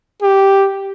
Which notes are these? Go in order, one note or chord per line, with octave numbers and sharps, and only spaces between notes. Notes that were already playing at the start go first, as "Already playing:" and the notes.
G4